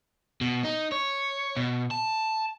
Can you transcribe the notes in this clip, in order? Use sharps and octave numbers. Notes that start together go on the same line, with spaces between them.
B2
D#4
C#5
B2
A5